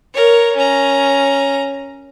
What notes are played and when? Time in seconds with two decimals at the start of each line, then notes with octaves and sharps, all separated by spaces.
0.14 A#4 C#5
0.56 C#4 A#5